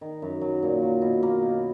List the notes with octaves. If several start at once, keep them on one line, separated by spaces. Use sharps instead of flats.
D#3
F#2
F#3
A#2
F#3
B2
A#3
B2